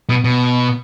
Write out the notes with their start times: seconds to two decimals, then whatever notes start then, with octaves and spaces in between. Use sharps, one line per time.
0.09 B2
0.24 B2